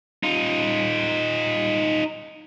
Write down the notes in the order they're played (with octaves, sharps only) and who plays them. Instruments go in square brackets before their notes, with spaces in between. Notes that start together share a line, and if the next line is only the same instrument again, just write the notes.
[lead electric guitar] D#4 F4